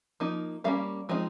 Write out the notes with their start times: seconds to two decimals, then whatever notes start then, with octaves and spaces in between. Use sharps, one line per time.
0.20 F3 A#3 D#4
0.64 G3 A#3 C#4 F5
1.09 F3 G#3 C4 D#4